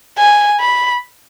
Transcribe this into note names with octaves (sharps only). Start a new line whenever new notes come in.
G#5
B5